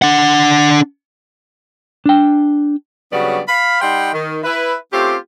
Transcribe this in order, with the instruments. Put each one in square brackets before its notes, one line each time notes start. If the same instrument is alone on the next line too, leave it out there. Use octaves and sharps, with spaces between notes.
[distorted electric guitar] D4 F#5
[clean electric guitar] D4 G5
[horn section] C#3 F#3 G3 B3 D4 F#4
F5 B5
G3 D#4 F#5 G5 C6
D#3
E4 B4
A3 C4 C#4 F4 G4